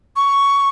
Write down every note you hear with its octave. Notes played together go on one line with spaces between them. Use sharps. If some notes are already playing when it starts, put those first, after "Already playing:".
C#6